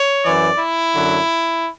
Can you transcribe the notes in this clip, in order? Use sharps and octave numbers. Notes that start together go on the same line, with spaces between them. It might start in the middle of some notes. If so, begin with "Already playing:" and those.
Already playing: C#5
F#2 E3 D5
E4
F#2 D3 F#3